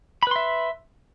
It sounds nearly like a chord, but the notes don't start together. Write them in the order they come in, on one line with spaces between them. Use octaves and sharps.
B5 B4 C6 E5